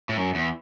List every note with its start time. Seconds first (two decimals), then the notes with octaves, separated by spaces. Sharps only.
0.09 A2
0.17 F#2
0.35 E2